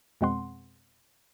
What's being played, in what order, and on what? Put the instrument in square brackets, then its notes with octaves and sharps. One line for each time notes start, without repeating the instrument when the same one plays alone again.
[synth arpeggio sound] F2 B2 G#3 C4 F#5 C6